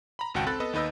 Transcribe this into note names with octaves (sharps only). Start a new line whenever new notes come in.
A#5 B5
G#1 C#2 F#4 F#5 G5 A5
C4 A4 B5 F#6 A6
B3 A4 B4 D#5
D#2 D#4 B4 D#5 E6